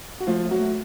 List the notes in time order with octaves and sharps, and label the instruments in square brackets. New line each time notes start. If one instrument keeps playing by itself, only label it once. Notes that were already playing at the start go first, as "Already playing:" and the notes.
[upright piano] F#4
[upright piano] F3 F4 [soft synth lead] A3
[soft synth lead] A3
[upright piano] F#3 F#4
[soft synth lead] A3